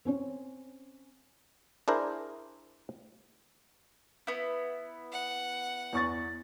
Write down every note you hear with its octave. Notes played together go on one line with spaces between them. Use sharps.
C4 C#4 C#5
D4 E4 G#4 A#4 C5
B3 E4
F#5
E2 C#6 A6